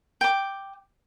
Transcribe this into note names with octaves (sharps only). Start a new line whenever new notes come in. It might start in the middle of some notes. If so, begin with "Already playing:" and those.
G5 D6